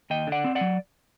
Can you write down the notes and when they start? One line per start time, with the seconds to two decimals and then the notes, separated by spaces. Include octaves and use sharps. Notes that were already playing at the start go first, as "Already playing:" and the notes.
0.10 D#2 D#5 G5
0.27 D3
0.32 D5 F#5
0.44 C4
0.55 D5 F#5
0.61 F#3